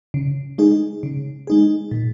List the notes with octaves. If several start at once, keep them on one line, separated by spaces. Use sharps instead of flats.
C#3
G#3 D#4 G#4
C#3
G#3 D#4 G#4
A#2